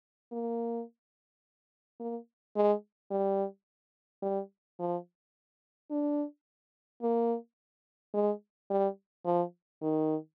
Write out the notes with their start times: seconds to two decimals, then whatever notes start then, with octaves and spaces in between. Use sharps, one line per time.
0.32 A#3
2.00 A#3
2.56 G#3
3.11 G3
4.23 G3
4.79 F3
5.91 D4
7.02 A#3
8.14 G#3
8.70 G3
9.25 F3
9.82 D#3